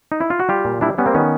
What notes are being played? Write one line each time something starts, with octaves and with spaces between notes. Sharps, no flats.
D#4
E4
F4
F#4
G3 F4 G4
A#2
G3 D4 E4
G3 B3 C#4
A#3 C4
D#3 B3 C#4